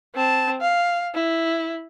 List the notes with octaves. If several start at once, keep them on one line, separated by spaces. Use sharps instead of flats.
C4 A5
F5
E4